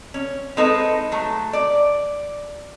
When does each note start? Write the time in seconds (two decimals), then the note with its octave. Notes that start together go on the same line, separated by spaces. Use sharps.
0.14 C#4
0.57 G#3 C4 D#4 A4 B4
1.12 F#3 A3
1.53 D5